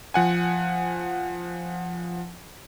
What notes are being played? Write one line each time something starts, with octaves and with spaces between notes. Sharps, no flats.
F3 F#5 G#5